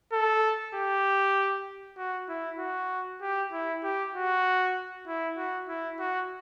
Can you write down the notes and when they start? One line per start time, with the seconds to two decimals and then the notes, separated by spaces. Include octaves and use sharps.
0.13 A4
0.75 G4
1.98 F#4
2.29 E4
2.59 F#4
3.22 G4
3.52 E4
3.84 G4
4.15 F#4
5.07 E4
5.37 F#4
5.68 E4
5.99 F#4